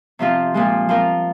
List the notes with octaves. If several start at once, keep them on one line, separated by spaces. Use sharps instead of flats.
C3 F3 C4 F4
A#2 F3 G#3
F3 C4 F4 A#4